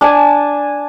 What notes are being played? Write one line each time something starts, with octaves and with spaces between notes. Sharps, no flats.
D4 G#5 A5